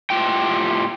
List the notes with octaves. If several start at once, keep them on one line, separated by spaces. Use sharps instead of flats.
A2 F4 G4 G5